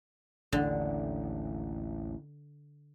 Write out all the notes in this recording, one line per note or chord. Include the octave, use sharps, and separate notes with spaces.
A1 D#2 D3